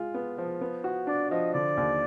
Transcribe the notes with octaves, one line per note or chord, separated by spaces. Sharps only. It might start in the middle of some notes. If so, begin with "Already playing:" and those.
Already playing: G#3 F4
B3
F3
B3
F#4
D4 D5
F3 D#5
D3 D5
D#2